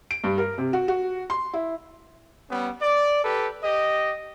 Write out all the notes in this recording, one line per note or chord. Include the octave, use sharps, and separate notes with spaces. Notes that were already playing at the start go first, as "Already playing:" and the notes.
D7
G2
A#4
C3
F#4
F#4
C6
E4
G3 B3 C#4
D5
G4 A4 B4
G4 D#5